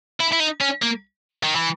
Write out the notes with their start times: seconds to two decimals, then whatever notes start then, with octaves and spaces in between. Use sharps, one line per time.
0.20 E4
0.32 E4
0.39 D#4
0.61 C#4
0.82 A#3
1.43 D#3
1.56 E3